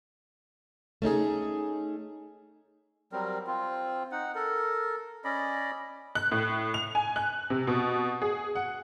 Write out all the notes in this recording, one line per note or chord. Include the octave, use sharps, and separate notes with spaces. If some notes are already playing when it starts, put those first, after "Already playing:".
A3 C#4 D#4 G#4
F#3 G3 C4 A#4
C4 F4
D#4 F#5
A4 A#4
C#4 D5 D#5 B5
F#6
A2
F7
G#5
F#6
C3
B2
G#4
F#5